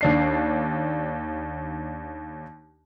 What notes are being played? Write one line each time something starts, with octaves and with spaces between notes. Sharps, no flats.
D#2 D4 C7